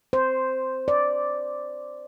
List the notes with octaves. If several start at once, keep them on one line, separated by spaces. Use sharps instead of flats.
C5
D5